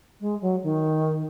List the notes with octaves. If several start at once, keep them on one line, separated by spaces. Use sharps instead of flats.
G#3
F#3
D#3